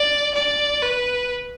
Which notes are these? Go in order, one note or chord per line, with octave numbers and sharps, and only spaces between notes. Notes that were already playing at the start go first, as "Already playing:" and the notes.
Already playing: D5
D5
B4